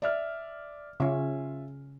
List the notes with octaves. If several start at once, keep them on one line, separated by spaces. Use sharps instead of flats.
D5 E5 F6
C#3 C#4 F4 E5